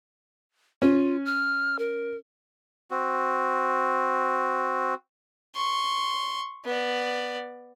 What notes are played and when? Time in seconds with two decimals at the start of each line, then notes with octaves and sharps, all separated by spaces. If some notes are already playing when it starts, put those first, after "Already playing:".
0.82 C#4 F4
1.26 F6
1.79 A#4
2.91 C4 F#4
5.55 C6 C#6
6.65 B3 D5